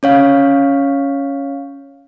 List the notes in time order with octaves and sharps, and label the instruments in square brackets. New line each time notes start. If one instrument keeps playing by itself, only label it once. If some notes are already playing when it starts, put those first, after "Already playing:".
[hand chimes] C#4 C#5 F5